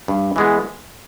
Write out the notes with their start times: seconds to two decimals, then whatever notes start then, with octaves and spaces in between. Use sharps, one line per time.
0.08 G2
0.36 E3 G#3 B3